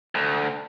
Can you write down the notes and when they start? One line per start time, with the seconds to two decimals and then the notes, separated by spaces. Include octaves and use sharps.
0.15 D2